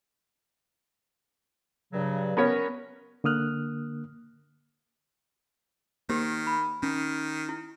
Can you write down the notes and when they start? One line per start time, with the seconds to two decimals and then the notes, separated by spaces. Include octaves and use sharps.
1.93 G2 C#3 F#3
2.37 B3 C#4 A#4 C#5
3.24 D3 A#3 D#6 F6 F#6
6.09 D#3 A#3 G4 A#4 C5
6.47 B5
6.83 D#3 C#4
7.49 E4